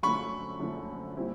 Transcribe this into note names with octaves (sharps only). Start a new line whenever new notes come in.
F#2 D3 F3 A3 B5 C#6
F#2 D3 F3 A3
A#2 G3 C4 E4